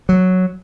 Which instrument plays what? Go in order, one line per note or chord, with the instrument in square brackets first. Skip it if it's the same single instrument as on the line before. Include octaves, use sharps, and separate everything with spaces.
[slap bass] F#3